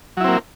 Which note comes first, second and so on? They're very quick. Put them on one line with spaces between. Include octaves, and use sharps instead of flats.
F#3 E4 C4 A#3